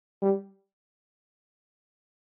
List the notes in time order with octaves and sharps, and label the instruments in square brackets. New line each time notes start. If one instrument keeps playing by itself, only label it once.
[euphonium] G3